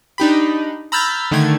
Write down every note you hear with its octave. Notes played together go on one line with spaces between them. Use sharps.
D4 D#4 G4 B5
A#5 B5 E6 F6 G6 A6
D3 D#3 A3 G#6